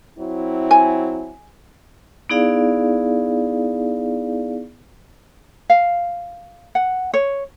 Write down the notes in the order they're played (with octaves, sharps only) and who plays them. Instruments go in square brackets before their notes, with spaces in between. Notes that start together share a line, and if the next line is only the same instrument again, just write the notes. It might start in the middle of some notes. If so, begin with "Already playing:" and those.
[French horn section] F#3 C4 E4
[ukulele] G#5
[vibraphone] B3 D#4 E4 G#4 D5 F5
[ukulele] F5
F#5
C#5